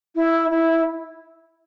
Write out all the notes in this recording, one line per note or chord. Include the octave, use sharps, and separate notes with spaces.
E4
E4